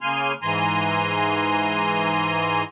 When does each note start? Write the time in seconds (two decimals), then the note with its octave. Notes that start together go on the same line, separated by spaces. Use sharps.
0.01 C#3 A#3 G#5 C6 F6
0.42 G#2 E3 G#5 A#5 C6